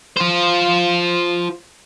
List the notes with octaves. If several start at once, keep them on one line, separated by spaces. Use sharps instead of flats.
F4 C5